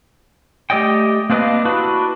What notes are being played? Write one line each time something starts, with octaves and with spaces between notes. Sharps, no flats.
A3 G4 D5 D#5 G5
A#3 C4 D4 B4 D#5 F5
D4 E4 F#4 B4